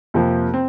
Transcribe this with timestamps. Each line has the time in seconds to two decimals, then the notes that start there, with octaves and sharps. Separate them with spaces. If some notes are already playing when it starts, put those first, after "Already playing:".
0.14 F2 C3 F3 A#3
0.54 C4